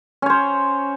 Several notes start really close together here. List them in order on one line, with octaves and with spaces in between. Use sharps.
C#4 C#5 C5